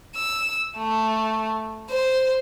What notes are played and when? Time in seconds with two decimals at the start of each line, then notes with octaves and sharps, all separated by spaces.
0.16 E6
0.77 A3
1.90 C5